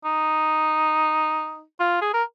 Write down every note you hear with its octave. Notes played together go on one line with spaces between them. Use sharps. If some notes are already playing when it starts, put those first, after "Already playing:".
D#4
F4
G#4
A#4